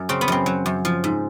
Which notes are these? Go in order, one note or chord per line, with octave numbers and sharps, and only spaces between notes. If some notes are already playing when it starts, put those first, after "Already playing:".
Already playing: F#2
C#3 C4
B3
F#2 C4
F#3
F#2
F3
G#2